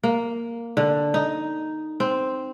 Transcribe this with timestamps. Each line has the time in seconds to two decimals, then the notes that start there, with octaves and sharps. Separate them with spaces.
0.03 A#3
0.77 D3
1.14 D#4
2.00 C4